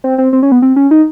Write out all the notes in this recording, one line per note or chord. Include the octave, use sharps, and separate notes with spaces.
C4
C4
C4
C#4
B3
C4
C#4
D#4